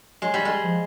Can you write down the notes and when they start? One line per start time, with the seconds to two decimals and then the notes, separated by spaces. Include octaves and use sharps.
0.21 F#3 G#3
0.34 G3
0.45 G#3
0.63 F3